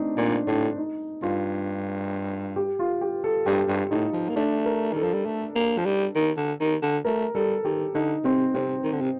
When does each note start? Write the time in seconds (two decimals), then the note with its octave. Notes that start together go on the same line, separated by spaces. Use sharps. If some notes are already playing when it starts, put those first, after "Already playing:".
Already playing: A3 C4 D4 D#4
0.17 A#2 D4
0.47 A2 D4
0.78 D#4
1.22 G2 F4
2.56 G4
2.79 F4
3.01 G4
3.24 A4
3.46 G2 G4
3.68 G2
3.91 A2 D#4
4.14 F3
4.29 A#3
4.36 A3 D4
4.66 A#4
4.93 D#3 A4
5.03 F3
5.14 G3
5.26 A3
5.56 A#3
5.78 F3
5.86 G3
6.15 D#3
6.37 D3
6.60 D#3
6.82 D3
7.05 A3 A#4
7.35 G3 A4
7.65 D#3 G4
7.95 D3 D#4
8.24 C3 C4
8.54 C3 C4
8.84 D#3
8.92 D3
9.01 C3